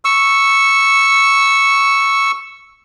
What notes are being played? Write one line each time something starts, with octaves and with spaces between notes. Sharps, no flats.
C#6 E6